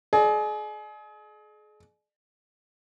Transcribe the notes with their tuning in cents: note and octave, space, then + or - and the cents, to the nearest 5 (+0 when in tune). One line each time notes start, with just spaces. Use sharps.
G#4 +35 D5 +45